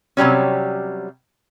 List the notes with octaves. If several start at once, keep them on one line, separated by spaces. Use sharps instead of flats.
C3 F#3 G3 C#4